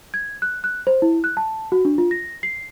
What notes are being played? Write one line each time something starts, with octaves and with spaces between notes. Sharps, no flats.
G#6
F#6
F#6
C5
E4
F#6
A5
F#4
D4
F4
A#6
C7